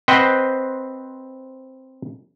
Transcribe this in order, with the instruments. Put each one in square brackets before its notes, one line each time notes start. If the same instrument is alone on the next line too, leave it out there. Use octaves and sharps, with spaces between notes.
[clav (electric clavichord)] C4 B4 C5 D#5 F#5 G5